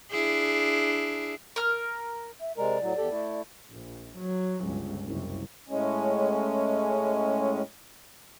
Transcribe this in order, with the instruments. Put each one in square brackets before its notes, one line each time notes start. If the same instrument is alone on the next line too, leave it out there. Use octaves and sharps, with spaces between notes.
[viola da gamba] D4 E4 G#4
[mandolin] A#4 F6
[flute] E5
[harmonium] C3 G#3 A#4 [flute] D5
[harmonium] A2 F#3
E2 G4 A4
A3 E4
[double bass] A#1
F#3
G1 C#2
F#1 C2
[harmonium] A2 G#3 C#4